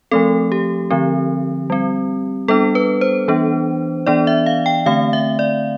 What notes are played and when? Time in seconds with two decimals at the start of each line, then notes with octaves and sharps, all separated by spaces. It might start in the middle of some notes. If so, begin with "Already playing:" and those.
0.11 F3 A3 C4 A4
0.52 G4
0.91 D3 F3 C4
1.70 G3 C4
2.48 G3 B3 D4 A4
2.75 B4
3.01 C5
3.28 E3 B3 D4
4.07 E3 B3 D4 D5
4.27 E5
4.46 F5
4.66 G5
4.86 D3 A3 C4 F5
5.13 E5
5.39 D5